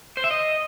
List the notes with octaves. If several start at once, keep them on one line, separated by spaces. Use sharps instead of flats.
C5
E5
D#5